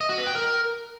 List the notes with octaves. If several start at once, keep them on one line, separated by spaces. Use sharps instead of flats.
D#5
F#4
B4
G5
A#4